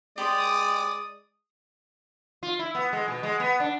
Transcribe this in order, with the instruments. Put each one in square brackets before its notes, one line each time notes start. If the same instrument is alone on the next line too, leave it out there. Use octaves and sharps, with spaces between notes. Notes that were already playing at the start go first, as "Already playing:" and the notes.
[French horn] G#3 [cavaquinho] G4 B5 C6 [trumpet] D5 [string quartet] D#6
[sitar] F4
E4
B3
G#3
B2
G#3
B3
D4